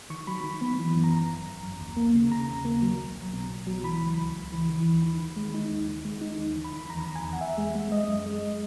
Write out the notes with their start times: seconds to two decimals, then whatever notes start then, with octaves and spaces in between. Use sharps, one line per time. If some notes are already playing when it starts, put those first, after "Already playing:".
0.10 D#3 C#6
0.27 F#3 B5
0.44 D#3
0.61 B3
0.79 E3
0.95 F#2
1.04 A#5
1.12 G#1
1.29 G#1
1.47 G#1
1.63 F#2
1.80 D#2
1.97 A#3
2.15 C#3
2.31 C#3 A#5
2.49 D#2
2.65 A#3
2.82 F#3
2.99 B1
3.15 B1
3.33 B2
3.50 B1
3.67 F#3
3.83 E3 B5
4.01 C#2
4.18 C#2
4.34 C#2
4.52 E3
4.69 E3
4.86 D#2
5.02 D#3
5.20 D#3
5.36 G#3
5.54 D#4
5.71 D#2
5.88 D#3
6.05 G#3
6.21 D#4
6.38 D#2
6.56 D#3
6.65 B5
6.73 D#3
6.89 E2 A#5
7.07 E2
7.15 G#5
7.23 E2
7.33 F#5
7.41 E2 E5
7.58 G#3
7.75 G#3
7.91 G#3 D#5
8.08 F#2
8.26 G#3